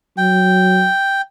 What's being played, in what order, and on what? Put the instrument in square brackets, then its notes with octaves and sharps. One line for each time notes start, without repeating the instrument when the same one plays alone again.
[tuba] F#3 [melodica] G5